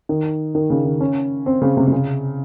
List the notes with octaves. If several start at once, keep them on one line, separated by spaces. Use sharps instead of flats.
D#3
D#3
C#3
D#3
C#4
C4
C#3
C3
C3
C#3